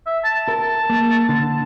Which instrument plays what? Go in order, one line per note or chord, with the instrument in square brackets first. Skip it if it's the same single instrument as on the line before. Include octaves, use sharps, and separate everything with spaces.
[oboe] E5
A5
[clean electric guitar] A#4 [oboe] A5
[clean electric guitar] A#3
D3